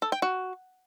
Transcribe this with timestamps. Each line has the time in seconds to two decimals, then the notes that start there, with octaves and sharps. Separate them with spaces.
0.02 A4
0.12 G5
0.22 F#4